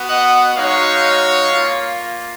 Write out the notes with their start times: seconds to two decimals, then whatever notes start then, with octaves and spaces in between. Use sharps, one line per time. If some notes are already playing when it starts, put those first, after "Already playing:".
Already playing: B3 F#4
0.09 D#5 F#5
0.57 G#3 D#4 F#4 C#5 F5
1.52 A#3 F4